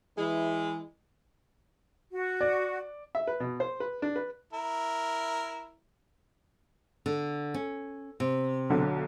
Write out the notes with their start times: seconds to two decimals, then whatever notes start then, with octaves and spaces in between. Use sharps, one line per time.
0.18 E3 G#3 E4
2.12 F#4
2.41 D5
3.15 E5
3.28 B4
3.40 B2
3.60 C5
3.80 B4
4.02 D4
4.16 B4
4.53 E4 A#4
7.06 D3
7.54 C#4
8.20 C3
8.70 B1 D3